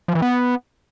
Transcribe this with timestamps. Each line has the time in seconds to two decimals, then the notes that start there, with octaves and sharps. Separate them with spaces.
0.08 F3
0.15 E3
0.22 B3